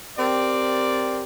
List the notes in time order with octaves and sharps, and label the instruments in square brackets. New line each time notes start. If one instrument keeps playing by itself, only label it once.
[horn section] C4 G4 A#4 D5